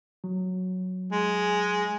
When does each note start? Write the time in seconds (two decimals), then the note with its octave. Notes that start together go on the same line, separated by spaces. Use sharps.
0.24 F#3
1.12 G#3